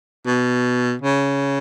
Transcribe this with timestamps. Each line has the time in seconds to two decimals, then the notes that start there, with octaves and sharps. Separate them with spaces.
0.26 B2
1.02 C#3